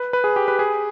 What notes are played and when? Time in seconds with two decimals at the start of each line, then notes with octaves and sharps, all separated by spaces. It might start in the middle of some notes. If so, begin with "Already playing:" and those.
Already playing: B4
0.13 B4
0.24 G#4
0.36 G4
0.48 B4
0.59 G#4